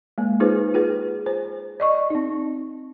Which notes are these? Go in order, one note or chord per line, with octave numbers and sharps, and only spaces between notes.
G#3 A#3
D#4 F4 G#4 B4 C5
F4 G#4 B4
C5
D5 D#5 C#6
C4 D#4